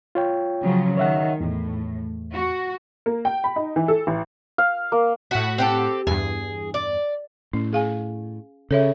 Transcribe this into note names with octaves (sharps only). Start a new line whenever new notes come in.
F4 C#5 G5
C#3 F3 F#3
D#3 C#5 E5 F#5
E2 A2
F#4
A#3
G5
B5
D#4
E3
A4
A1
F5
A#3
A2 F#4 F#5 B6
C4 G4 A4
E2 G2 G#4
D5
A2 C#4
G#4 F5 G#5
C#3 A4 C#5 E5